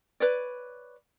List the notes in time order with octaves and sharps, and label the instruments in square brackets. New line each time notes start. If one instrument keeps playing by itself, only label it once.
[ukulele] B4 C#5 D5